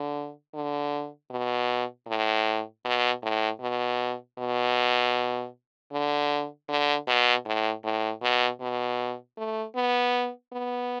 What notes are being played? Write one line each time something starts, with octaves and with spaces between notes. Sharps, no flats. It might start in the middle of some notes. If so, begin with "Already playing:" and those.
Already playing: D3
D3
B2
A2
B2
A2
B2
B2
D3
D3
B2
A2
A2
B2
B2
A3
B3
B3